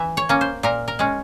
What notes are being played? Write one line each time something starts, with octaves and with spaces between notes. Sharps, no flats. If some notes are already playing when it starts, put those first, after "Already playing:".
Already playing: E3 E5
C#5
A#3 C#4
C5
A#2 A#4
A#4
G#3 C#4